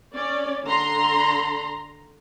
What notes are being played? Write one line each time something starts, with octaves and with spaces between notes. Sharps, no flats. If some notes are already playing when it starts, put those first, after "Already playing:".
C#4 D5
D3 A#5 C6